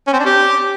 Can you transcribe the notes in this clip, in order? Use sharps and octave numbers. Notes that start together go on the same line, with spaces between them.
C#4
C4
D4
G4